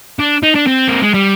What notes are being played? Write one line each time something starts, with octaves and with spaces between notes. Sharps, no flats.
D4
D#4
D4
C4
A#3
G#3
G3